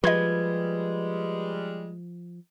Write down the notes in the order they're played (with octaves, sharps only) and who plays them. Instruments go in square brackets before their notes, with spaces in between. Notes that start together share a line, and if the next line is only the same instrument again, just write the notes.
[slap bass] F3 [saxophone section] G3 G#3 [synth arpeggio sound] F4 D#5 [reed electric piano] B4 G#6